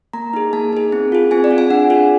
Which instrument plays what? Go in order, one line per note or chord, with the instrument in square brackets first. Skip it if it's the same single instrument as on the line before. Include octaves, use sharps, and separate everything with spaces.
[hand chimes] A#3 A#5
D#4 G#4
A#3 A5
D#4 G#4
C4
F4 G#4
C4 G#5
D5
F4 G#4
G#5
D4 F#5
F4 G#4